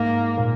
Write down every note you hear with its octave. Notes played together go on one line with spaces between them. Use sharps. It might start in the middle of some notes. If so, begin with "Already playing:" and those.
Already playing: G#2 A#3
A#2